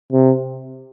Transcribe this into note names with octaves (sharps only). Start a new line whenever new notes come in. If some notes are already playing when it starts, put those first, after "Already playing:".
C3